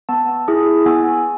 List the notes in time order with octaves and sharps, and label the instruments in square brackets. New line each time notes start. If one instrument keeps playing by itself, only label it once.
[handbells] B3 A5
E4 G#4
B3 G#5